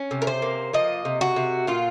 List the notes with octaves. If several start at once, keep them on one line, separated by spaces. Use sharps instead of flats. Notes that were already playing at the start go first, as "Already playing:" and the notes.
Already playing: C#4
C3
A#4
C5
A#3
F3 D#5
C3
F#4
C3
A#2 F4